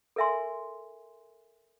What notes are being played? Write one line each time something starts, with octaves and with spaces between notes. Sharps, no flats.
A4 A#4 E5 G#5 C6